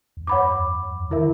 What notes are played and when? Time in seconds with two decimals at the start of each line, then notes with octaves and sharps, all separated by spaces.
0.17 E2
0.27 F#2 C#5 F#5 B5 D6
0.49 E2
0.70 F#2
0.90 E2
1.11 D3 E4 A#4 E5
1.18 E3